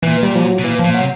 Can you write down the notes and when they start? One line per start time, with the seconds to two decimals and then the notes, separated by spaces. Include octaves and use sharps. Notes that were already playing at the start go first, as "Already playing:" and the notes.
0.03 A#2 E3
0.23 G3
0.35 F3
0.44 F#3
0.59 B2
0.64 A#2 E3
0.79 F3
0.85 A#2
0.94 F#3
1.00 C3